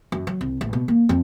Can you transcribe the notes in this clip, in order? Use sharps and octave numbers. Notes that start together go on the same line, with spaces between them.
F#2
F#3
C2
A1
B2
A#3
F2